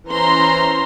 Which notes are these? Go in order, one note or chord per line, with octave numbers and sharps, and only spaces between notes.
E3 C#4 C5 A#5 C6